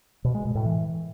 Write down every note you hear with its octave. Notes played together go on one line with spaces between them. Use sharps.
B2
G#3
B2
A2
E3